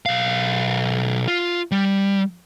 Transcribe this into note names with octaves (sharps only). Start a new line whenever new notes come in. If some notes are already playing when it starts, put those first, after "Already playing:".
B1 F5
F4
G3